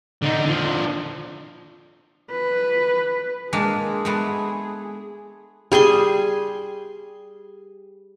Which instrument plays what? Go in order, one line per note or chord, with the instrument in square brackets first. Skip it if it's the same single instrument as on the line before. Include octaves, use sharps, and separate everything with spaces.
[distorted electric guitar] D3 D#4
D3 F3
[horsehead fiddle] B4
[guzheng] G#3 A#3 D4 [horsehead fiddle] G#4
[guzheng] G#3 A3 B3
[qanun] G3 G#4 G#5 C6